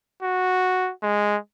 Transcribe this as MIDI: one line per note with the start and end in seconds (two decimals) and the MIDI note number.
0.22 0.91 66
1.03 1.37 56